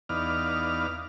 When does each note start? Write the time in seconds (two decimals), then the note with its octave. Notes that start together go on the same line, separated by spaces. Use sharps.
0.09 E2 B3 D#4 D5 F5 F6